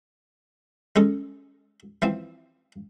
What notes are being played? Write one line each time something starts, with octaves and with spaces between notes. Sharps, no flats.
G#3 C#4 A4
E3 F3 C4